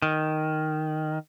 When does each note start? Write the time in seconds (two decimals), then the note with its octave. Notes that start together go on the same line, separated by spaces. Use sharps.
0.02 D#3